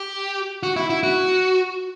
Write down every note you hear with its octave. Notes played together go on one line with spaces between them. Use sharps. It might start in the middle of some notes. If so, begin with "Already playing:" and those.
Already playing: G4
F#4
E4
E4
F#4